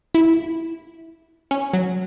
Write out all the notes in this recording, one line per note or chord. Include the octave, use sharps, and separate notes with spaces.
E4
C#4
F#3